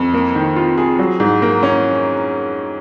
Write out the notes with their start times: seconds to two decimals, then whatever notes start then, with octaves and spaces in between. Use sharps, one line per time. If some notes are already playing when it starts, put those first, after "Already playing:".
Already playing: F2
0.14 A#3
0.35 D#3
0.56 F4
0.78 G#4
0.99 F#3
1.20 G#2
1.42 A#3
1.63 C#4